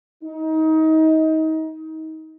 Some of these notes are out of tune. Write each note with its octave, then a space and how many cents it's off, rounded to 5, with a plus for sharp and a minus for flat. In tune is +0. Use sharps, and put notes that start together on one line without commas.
D#4 +25